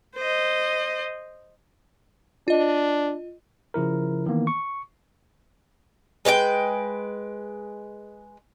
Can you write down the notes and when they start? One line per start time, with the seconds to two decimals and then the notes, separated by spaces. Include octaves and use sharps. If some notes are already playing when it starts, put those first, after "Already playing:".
0.16 C5 D#5
2.48 D4 F4 D#5
3.74 C#3 F3 E4 A#4
4.26 D#3 E3 A#3 B3
4.47 C#6
6.25 G#3 B4 C#5 G5